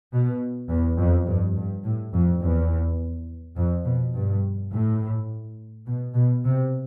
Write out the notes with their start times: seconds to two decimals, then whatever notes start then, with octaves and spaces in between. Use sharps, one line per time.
0.13 B2
0.70 E2
0.99 F2
1.27 G2
1.57 G2
1.84 A2
2.13 F2
2.42 E2
3.57 F2
3.85 B2
4.15 G2
4.72 A2
5.87 B2
6.15 B2
6.45 C3